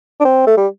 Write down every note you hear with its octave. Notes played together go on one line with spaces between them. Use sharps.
D4
C4
A3
G3